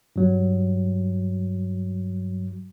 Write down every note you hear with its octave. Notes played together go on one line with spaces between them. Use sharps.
G2 F#3